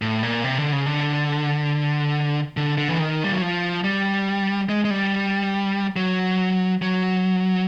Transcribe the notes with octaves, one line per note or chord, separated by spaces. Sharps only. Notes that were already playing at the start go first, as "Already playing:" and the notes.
A2
A#2
C3
D3
C#3
D3
D3
D3
E3
D#3
G3
F#3
F3
G3
G#3
G#3
G3
F#3
F#3